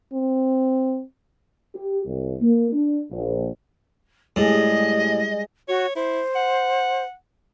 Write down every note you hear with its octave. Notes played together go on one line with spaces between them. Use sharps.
C4
G4
C2
A#3
D4
A#1
A2 G3 G#3 G#4 D#5
F#4 C#5
E4 C5
F#5